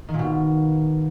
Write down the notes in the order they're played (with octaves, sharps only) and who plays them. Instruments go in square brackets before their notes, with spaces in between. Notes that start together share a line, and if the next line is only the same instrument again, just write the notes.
[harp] D#3
A#2
B2